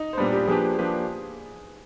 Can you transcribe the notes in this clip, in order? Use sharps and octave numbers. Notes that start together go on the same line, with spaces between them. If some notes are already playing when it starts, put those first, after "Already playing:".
Already playing: D#4 D#5
C5
A#2 G3 A#3 B3 D4 B4
G4
F3 A#3 D4 G4 G#4 B4
F3 A#3 D4 G4 B4